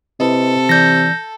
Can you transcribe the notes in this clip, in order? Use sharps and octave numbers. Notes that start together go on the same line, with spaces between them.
C3 E4 A4 B4 D#5
E3 D5 G6 A#6